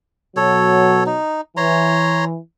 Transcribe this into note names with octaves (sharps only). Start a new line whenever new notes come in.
B2 F#3 A4 C#5
D#4
E3 C#5 A#5 C6